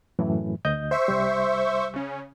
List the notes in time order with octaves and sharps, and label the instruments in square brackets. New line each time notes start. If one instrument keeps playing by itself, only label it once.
[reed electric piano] F#2 A2 E3
D2 D#5 G6
[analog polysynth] C5 E5 C#6
[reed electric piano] C2 G3
[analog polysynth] C#3 C#4